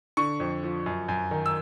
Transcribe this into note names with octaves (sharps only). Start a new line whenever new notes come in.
D3 C#6
F2
F3
F#2
F#2
D#3
E6